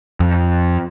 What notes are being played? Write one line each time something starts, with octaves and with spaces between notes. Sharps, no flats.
F2